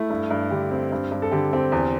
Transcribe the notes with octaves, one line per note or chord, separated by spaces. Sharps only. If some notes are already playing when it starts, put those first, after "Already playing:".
Already playing: A3 E4
G2
G2
D3 G4
C4
G2
G2
A4
D3 G4
C4 G4
E2